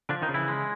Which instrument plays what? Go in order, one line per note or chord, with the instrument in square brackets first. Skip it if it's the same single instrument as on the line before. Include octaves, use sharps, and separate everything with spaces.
[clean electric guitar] D3 F3 D4
D#3 D#4
C#3
E3 E4
G#3